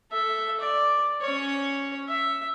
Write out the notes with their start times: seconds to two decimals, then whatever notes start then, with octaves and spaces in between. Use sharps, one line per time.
0.11 A4 E5
0.60 D5
1.21 C#4 C#5
2.08 E5